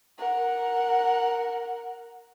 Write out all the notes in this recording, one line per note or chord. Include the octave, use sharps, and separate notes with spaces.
A#4 F#5